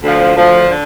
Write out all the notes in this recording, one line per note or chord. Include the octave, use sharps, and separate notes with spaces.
D2 D3 F3
D2 D3 F3
D3